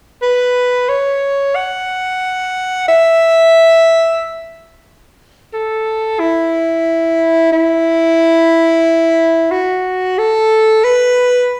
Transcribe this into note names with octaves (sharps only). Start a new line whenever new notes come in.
B4
C#5
F#5
E5
A4
E4
E4
F#4
A4
B4